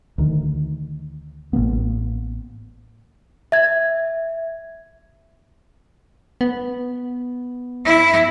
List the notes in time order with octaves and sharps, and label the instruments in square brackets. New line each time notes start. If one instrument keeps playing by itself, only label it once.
[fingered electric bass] D2 D#3
A1 F3 A#3 B3
[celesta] E5 G#6
[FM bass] B3
[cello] E4